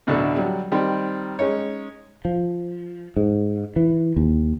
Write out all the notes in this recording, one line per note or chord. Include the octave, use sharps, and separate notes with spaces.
A1 D2 B2 D3 A4 D5
F#3 G3
D#3 G3 C4 D#4
G#3 C#4 D#4 C#5
F3
G#2
E3
D#2